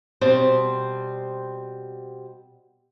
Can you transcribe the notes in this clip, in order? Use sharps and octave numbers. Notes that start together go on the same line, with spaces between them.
B2 G3 C4 C5